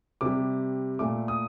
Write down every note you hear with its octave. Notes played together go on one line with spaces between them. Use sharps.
C3 G3 D6
A#2 A3 D6
D#6